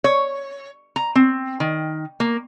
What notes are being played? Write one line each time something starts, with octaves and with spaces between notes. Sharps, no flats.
C#5
A#5
C4
D#3
A#3